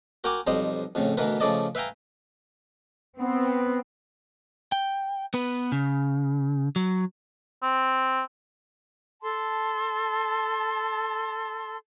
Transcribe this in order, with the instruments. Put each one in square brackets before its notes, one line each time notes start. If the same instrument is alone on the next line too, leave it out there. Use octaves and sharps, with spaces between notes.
[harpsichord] F#4 A#4 G5 G#5 A#5 D6
B1 F2 G3 C5 D#5
F2 A2 C#3
D2 B2 E3 A#4 B4
C#3 F3 A3 D5 D#5 A5
B4 E5 F5 G5 G#5 A#5
[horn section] B3 [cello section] C4
[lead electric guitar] G5
B3 B4
C#3
F#3
[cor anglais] C4
[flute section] A4 A5 C6